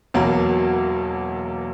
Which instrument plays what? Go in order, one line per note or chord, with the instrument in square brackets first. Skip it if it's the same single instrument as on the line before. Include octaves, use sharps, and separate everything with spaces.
[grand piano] E1 E2 B2 F#3 A#3